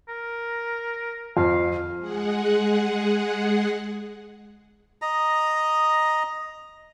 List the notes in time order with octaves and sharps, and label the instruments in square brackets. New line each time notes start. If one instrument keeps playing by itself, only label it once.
[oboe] A#4
[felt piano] F2 [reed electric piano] F4 [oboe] F5
[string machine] G#3 G#4 F#5
[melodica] D#5 A#5